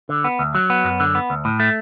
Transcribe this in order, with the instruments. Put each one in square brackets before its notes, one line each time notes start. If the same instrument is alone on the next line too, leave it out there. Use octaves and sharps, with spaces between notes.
[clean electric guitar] D3
B3
D2
F#3
B3
F#2
D3
B3
D2
A2
A3